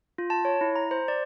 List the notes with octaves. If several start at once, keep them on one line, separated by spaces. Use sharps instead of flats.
F4
A5
C#5
E4
A#5
C5
D5